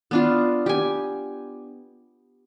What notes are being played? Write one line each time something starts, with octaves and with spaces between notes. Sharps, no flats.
B3 D4 F4
G4 G#5